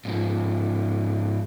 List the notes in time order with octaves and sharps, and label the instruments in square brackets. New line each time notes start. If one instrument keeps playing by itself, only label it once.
[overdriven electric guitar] G#2 F3